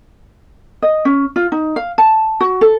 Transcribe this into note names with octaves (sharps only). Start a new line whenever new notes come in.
D#5
C#4
F4
D#4
F5
A5
F#4
A4